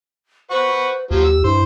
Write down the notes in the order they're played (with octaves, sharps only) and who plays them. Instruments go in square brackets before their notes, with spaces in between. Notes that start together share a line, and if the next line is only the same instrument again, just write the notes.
[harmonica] B4 F#5 C#6 [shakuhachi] C5
[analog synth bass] D#2 [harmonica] F3 F#3 [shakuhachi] G4
[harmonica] E6
[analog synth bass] G2 [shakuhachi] E4 [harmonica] C5